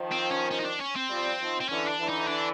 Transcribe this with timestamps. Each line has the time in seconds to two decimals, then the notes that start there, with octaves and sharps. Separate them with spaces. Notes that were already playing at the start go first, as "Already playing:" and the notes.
Already playing: D#3 F3
0.12 C4
0.31 C#4
0.51 C#4
0.60 D#4
0.65 D4
0.80 C#4
0.96 C4
1.10 F3 G3
1.39 D#3 F3
1.61 C4
1.69 D3 E3 C#4
1.88 D4
1.98 D3 E3
2.09 D#4
2.28 D4